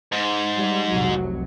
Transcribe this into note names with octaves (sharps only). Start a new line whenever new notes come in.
G#2
G3
F1 C2 F#3